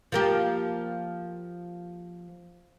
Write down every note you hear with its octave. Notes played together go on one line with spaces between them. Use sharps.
F3 A#3 G4